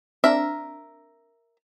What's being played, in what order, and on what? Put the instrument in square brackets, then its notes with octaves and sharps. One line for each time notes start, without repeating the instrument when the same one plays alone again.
[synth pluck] C4 D4 [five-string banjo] A#4 E5